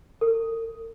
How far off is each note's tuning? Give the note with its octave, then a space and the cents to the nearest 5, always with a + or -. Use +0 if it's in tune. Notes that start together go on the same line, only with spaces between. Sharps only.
A#4 -45